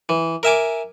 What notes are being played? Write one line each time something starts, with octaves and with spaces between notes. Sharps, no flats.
E3
A#4 E5 G#5 D6